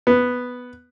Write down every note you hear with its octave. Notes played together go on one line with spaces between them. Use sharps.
B3